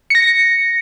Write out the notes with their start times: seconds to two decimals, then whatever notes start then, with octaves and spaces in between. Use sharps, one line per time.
0.10 A#6 C#7